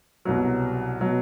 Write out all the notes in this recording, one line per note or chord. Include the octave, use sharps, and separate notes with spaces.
C2 B2 F#3
B2 F#3